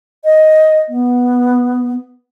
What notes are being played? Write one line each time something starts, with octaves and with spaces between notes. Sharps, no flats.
D#5
B3